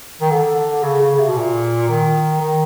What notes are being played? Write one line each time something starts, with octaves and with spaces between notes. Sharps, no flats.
D#3
D3
C#3
C#3
C3
B2
A#2
D#3
D#3